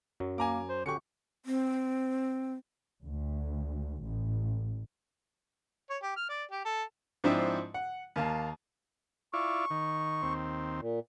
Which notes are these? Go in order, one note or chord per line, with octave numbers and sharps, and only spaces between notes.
F#2 F#3
A#3 G#5 A#5 D6
C5
D3 C#4 F#4 G4 C#6 C#7
C4
D2
A1
C#5
G4
F6
D5
G4
A4
G#2 F3 C4 D4 E4
F#5
D#2 A#3 F5 A5
E4 F4 D5 C#6
D#3
D#2 C4
A#2